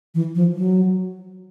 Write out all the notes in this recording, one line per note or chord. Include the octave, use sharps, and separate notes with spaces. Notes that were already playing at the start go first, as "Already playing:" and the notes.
E3
F3
F#3